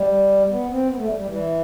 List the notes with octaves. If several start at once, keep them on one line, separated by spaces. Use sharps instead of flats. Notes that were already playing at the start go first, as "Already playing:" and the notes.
Already playing: G3
B3
C4
B3
A3
G3
G3
E3